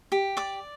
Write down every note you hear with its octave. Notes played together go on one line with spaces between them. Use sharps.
G4
D5 D6